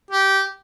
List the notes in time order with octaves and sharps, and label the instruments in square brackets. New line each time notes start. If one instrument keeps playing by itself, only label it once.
[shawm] G4